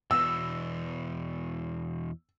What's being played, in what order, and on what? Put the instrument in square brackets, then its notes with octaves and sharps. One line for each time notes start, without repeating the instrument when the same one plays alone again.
[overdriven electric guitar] E2 B2 [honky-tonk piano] E6